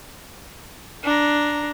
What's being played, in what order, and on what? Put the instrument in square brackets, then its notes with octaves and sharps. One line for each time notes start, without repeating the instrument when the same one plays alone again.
[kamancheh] D4 A#5